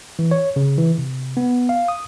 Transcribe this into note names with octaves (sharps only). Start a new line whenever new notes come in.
E3
C#5
C#3
E3
C3
B3
F5
D#6